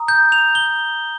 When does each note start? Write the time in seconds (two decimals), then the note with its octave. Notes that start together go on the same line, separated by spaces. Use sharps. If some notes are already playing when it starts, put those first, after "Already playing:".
Already playing: A#5 D#6
0.08 G6
0.32 F7
0.55 G7